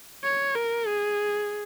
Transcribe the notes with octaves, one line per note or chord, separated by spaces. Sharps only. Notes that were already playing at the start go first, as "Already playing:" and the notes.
C#5
A#4
G#4